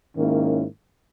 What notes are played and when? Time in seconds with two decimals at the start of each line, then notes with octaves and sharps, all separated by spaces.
0.15 G#2 D#3 A#3 C#4 E4